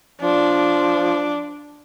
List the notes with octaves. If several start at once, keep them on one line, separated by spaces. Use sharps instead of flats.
F3 D4